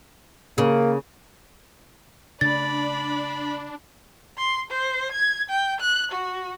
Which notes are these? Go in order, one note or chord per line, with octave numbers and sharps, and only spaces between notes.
C#3 A#3
C#3 A3 D4 D5 B5 A6
C6
C5
G#6
G5
F#6
F#4